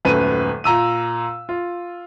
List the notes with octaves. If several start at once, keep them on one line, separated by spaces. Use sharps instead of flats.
D#1 F#2 A3 B4 D#7
A#2 A#5 E6 D#7
F4